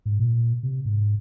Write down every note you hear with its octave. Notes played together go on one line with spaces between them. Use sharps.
G#2
A#2
C3
G#2